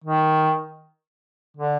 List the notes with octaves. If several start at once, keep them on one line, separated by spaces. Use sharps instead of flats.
D#3
D3